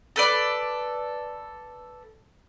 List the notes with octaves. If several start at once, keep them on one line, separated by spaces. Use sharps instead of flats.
A4 B4 D5